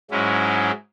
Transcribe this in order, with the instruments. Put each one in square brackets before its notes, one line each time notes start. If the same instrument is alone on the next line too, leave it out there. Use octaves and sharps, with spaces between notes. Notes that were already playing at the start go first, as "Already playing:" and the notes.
[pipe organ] G#2 F#3 G#3 C#4 E4